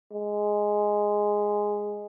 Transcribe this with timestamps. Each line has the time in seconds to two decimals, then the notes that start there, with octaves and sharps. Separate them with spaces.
0.12 G#3